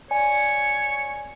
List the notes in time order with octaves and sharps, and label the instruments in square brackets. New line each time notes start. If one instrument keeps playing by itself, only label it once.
[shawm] C#5 [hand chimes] D5 G#5